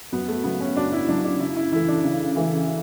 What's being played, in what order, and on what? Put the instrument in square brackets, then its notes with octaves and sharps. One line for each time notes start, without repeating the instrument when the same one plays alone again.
[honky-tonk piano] F#2 [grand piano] B3
[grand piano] A3
[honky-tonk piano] C#3 F#3 [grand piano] B3
[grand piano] C#4
[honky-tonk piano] F#2 [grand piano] D4
[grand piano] E4
[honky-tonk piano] C#3 F#3 [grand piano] D4
[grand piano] D4
[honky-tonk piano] C#3 [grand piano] E4
[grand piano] E4
[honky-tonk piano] E3 A3 [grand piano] E4
[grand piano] D4
[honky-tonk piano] C#3
E3 A3